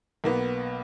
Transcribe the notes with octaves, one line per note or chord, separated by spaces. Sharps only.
B1 A#3 B3